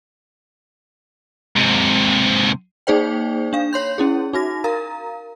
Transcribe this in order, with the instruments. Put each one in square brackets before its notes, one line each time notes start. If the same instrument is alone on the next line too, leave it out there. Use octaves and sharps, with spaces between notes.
[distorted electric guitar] G#2 C3
[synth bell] A#3 D#4 G#4 C5 D5 G5
D4 F5
C#5 C6 G6
C#4 E4 G#4
D#4 F#4 A#6
A#4 F5 A#5